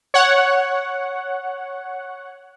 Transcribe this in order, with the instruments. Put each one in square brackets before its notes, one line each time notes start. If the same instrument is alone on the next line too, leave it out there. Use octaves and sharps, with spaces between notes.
[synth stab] C#5 F#5